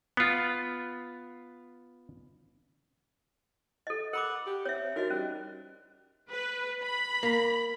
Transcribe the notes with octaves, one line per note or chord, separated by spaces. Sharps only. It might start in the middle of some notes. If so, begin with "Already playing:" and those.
B3 F4
A4 D#5
A#4 F#5 B5 D6
G4
C4 C#5 E5
D#4 F#4 A#4 D#5
G3 C#4
B4
B5
A#3